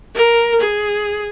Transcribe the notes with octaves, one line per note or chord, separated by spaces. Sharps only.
A#4
G#4